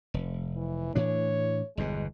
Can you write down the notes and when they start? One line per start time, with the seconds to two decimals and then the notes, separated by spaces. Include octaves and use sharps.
0.14 F1
0.56 E3
0.95 A2 E3 D4 C#5
1.77 G1 E2 B2 G#3